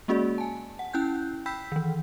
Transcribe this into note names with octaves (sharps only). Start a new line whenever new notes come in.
G#3 A#3 C#4 F#4 G#4 D5
G#5 A5
F#5
C#4 E4 G5 F#6 G6
G5 B5 E6 G6 B6
D#3 E3